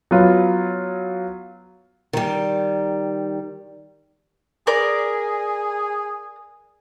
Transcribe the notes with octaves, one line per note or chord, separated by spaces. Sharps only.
F#3 B3 F4
D#3 G3
G#4 A#4 D5